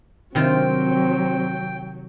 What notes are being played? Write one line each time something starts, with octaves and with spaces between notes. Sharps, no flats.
C3 D#3 F#3 C4 F4 G5